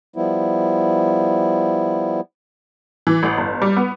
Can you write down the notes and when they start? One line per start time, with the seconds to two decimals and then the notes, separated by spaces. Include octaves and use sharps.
0.16 F3 G3 B3 E4
3.07 E3
3.23 A1
3.38 G1
3.62 G3
3.77 B3